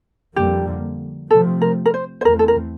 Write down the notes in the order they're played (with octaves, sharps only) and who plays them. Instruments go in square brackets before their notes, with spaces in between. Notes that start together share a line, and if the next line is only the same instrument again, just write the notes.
[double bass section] F2 D3 G3 A#3 [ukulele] G4
[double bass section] C3 F3 A3 C4 [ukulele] A4
[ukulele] A#4
A#4
C5
C5
[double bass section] E2 E3 A3 C4 [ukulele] A#4
[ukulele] A4
A#4